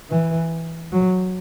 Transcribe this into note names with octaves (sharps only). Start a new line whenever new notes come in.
E3
F#3